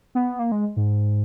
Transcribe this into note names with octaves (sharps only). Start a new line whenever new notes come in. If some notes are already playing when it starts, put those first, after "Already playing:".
B3
A#3
G#3
G#2